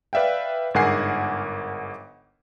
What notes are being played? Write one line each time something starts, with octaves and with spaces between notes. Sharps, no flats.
B4 D5 E5 F5 G5
G1 G#2 A#4 F#5 G#5 C7